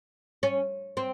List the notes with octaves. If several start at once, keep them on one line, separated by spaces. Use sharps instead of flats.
C#4
C4